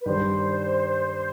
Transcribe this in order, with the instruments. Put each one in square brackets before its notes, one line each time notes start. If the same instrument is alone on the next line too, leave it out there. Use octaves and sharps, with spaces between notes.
[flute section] B4
[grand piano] G2 D#3 G3 [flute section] C5